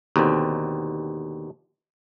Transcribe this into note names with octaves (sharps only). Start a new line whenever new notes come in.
D#2 B2 D3 C4